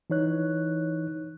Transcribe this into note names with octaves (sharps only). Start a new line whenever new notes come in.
E3 D#4 C#5 F#6